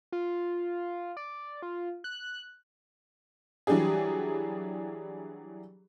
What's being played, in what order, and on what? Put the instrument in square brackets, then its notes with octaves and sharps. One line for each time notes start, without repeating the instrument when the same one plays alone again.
[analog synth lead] F4
D5
F4
F#6
[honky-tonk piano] E3 F#3 G3 D4 G4 G#4